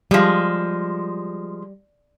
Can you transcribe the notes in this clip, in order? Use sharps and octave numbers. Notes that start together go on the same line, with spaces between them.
F3 G3 G#3